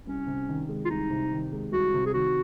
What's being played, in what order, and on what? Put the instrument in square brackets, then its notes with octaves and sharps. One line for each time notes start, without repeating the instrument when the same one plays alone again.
[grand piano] C2 [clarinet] C#4
[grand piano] C3
D#3
G#3
[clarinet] F4
[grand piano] C2 [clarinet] D#4
[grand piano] C3
D#3
G#3
[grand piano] C2 [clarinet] F#4
[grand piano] C3
[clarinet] G#4
[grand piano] D#3 [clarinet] F#4